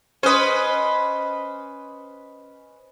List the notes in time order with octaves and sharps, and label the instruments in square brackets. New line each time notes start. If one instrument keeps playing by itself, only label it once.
[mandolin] C#4 D#5 [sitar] B4 C5